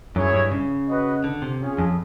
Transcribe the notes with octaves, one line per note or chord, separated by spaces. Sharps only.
F#2 E4 G#4 C#5
G2
C#3
F#4 B4 D#5
D3
C3
C#4 F4 G#4
F2